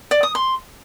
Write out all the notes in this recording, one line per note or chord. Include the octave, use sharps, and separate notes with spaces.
D5
D#6
C6